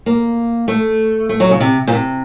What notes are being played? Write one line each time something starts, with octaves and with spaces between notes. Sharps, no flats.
A#3
A3
A3
F#3
C#3
C3
A#2
C3